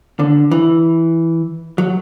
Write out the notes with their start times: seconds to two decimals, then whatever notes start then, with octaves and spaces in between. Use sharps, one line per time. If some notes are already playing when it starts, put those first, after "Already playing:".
0.19 D3
0.51 E3
1.78 F#3